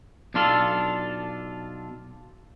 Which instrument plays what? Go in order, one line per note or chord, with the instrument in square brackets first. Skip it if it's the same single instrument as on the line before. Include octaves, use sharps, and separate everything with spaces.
[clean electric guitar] B1 D4 F4 A4